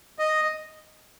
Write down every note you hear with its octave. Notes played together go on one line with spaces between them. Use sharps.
D#5